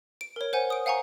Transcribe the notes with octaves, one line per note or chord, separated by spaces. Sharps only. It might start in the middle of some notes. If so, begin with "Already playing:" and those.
D7
A#4 C#5
C5 F#5 G#5
D#6 D7
F5 F#5 G#5 A#5 C#6